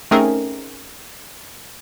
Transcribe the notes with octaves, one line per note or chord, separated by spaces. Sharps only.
A3 C4 C#4 D#4 G#4 A#4